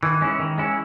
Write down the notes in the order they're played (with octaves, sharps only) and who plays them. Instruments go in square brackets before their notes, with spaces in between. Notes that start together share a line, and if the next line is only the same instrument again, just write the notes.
[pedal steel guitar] D#3 [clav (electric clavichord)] E3
[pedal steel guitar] G#3 C#4 E4
D#3
G#3 C#4 E4